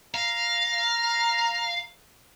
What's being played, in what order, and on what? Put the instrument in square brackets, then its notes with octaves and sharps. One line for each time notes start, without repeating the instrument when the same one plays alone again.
[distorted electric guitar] F5 [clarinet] A#5